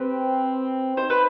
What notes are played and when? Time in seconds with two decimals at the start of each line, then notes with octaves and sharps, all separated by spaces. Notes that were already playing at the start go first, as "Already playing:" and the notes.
Already playing: C4 G4 B4
0.97 D#4 C5
1.10 B4